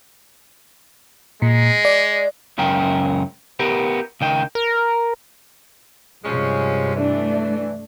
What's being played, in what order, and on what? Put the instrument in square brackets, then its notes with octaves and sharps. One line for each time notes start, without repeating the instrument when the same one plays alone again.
[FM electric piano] A#2 [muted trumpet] G#3
[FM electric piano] D5
[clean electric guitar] C#2 F#2 C#4 A#4 G5
B3 G4 A#4
C#2 D#3 G5
[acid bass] A#4
[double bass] G2 C3 [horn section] F3 G#3 C#4
[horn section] E3 [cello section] A3 D4